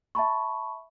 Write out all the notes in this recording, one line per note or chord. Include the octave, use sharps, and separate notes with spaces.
E5 A5 B5 C#6